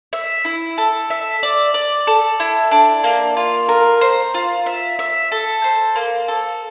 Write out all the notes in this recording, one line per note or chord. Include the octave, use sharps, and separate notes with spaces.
E5
E4
A4
E5
D5
D5
A4
E4
D4
A#3
F4
A#4
C5
F4
E5
E5
A4
C5
A#3
A4